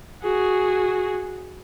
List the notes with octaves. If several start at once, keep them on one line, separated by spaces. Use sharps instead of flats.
F#4 G#4